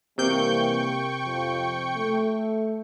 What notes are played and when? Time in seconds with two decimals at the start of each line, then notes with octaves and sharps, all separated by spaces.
0.18 C3 E3 G3 A#3 G5 C#6 G6
1.24 F2 F3
1.96 A3